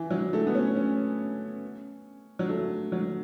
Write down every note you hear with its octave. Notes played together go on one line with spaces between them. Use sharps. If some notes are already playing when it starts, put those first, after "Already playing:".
Already playing: E3
F#3
A3
B3
C#4
C#4
F#3
A3
F#3